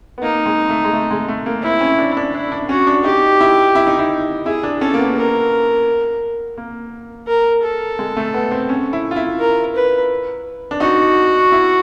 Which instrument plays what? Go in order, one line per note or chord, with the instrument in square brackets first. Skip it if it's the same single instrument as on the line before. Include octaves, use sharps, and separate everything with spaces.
[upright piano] B3
[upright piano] A#3 [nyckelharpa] D#4
[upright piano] G#3
A3
G#3
A3
G#3
A3
A#3
[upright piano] C4 [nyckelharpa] E4
[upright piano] C#4
D4
D4
[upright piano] D4 [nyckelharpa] E4
[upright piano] D4
[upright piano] C#4 [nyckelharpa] F#4
[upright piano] D4
[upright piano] D#4 [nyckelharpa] G4
[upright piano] E4
E4
D#4
E4
[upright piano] E4 [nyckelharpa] G#4
[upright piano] D4
[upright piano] C#4 [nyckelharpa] A4
[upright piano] A#3
B3
[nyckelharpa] A#4
[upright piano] A#3
[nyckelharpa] A#4
A4
[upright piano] G#3
A3
B3
C4
C#4
E4
F4
E4
[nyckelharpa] A#4
B4
[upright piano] D4
[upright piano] D#4 [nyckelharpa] F#4
[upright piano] E4